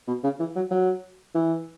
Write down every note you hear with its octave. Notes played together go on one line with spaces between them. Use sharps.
B2
C#3
E3
F#3
F#3
E3